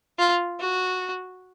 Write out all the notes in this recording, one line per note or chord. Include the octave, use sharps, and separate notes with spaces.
F4
F#4